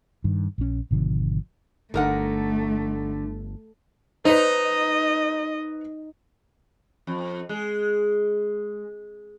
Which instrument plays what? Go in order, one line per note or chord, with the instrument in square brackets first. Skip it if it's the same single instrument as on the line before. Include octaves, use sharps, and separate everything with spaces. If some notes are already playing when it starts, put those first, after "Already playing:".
[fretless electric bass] G2 D#3
A#1 C#4
G#1 B2 D3 F3
[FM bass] G1 [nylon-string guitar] D3 [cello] A3 [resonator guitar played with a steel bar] D#4 A#4 F#5
[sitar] D#4 [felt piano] B4 C5 [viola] D#5
[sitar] F2
G#3